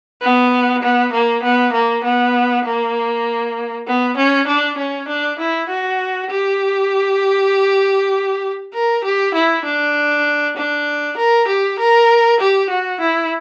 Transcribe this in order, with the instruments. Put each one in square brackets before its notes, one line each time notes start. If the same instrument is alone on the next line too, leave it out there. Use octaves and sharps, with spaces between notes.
[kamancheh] B3
B3
A#3
B3
A#3
B3
A#3
B3
C#4
D4
C#4
D4
E4
F#4
G4
A#4
G4
E4
D4
D4
A#4
G4
A#4
G4
F#4
E4